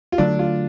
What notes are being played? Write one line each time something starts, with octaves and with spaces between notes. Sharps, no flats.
F4
D3 F#3 A3 D4
F4